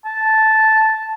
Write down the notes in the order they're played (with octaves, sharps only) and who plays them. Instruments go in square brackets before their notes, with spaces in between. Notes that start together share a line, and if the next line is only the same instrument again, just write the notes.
[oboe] A5